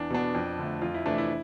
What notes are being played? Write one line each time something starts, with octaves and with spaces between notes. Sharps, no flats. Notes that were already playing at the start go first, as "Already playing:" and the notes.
Already playing: E2 D4
B2 B3 D4
F2
D3 A3
F2 F4
E4
C3 E3 A3 D4
E4